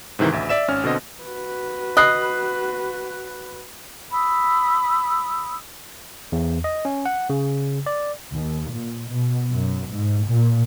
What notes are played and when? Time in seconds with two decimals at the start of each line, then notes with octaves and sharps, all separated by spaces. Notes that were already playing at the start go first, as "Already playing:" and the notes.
0.19 G#2 C3 D#3 E3
0.32 A1 D2 E5
0.49 D5 E5 E7
0.68 G#1 C#4 F6
0.84 B2 D3 C4 D#5
1.23 F#4 B4
1.97 D#5 B5 F#6 C7
4.11 B5 D#6 E6
6.32 E2
6.64 D#5
6.85 C#4
7.06 F#5
7.30 C#3
7.86 D5
8.33 D#2
8.73 A#2
9.11 B2
9.52 F#2
9.89 G#2
10.27 A#2